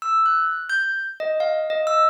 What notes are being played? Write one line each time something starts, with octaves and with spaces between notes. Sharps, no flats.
E6
F#6
G6
D#5
F5
D#5
E6